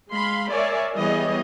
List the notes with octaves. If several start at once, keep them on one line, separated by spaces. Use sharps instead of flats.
G#3 F5 B5 C6
A#4 C#5 D5 E5 G#5
E3 G3 B3 G#4 C#5 D#5